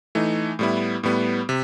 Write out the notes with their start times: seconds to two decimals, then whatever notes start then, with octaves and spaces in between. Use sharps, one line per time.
0.15 E3 A3 D#4
0.59 A2 G3 B3 E4
1.03 A2 G3 B3
1.49 C3